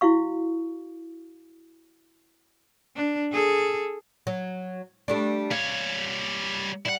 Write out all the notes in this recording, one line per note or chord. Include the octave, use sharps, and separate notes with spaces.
E4 F#4 F5 C#6
D4
G#4 A4
F#3
G3 A3 D4
G3 C#5 F5
G3 E4 F#5